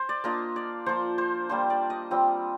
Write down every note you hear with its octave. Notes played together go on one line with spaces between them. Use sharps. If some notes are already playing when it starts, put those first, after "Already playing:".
Already playing: C5
D5
A#3 D4 F4 D#5
D5
F3 A#3 F4 C5
C5
G3 A#3 D4 F4 C5
D5
D#5
G3 C4 F4